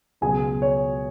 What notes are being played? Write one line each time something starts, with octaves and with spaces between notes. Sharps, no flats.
C#2 B2 F#3 G#4 G#5
C#5